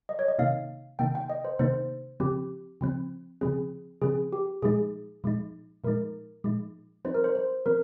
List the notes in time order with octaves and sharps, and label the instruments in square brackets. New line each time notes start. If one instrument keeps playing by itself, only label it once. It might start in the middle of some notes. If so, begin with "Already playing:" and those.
[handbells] D#5
C#5
D#5
[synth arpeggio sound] C3 D#3 A#3 D#4 [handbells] F5
[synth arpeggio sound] C3 D#3 A#3 D#4 [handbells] G5
[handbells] G5
D#5
C5
[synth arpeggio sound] C3 D#3 A#3 D#4 [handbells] C5
[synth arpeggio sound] C#3 F3 C4 [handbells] G4
[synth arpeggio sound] C#3 F3 C4
[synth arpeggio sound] C#3 F3 C4 [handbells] G#4
[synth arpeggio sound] C#3 F3 C4 [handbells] G#4
[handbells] G4
[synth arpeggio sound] A#2 F3 G#3 D#4 [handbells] G#4
[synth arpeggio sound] A#2 F3 G#3 D#4
[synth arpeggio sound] A#2 F3 G#3 D#4 [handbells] A#4
[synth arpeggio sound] A#2 F3 G#3 D#4
[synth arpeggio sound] F3 C4 D#4 [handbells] C5
[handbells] A#4
C5
C5
[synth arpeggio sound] F3 C4 [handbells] A#4